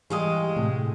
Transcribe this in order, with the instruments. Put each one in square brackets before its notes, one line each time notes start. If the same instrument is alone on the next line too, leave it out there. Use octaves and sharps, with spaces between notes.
[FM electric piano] E3 [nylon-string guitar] G3 G4 G#4 [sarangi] G#3 [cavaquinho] D#5 F5 C#6
[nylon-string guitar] A2 [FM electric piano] C3